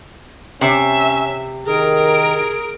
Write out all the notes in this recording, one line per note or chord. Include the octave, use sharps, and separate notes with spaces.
C3 C#4 E5
D#3 G#4 A#4 D7